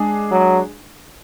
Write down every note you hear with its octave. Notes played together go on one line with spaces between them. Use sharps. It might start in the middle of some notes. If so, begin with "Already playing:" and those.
Already playing: G#3 D4 G#4
F#3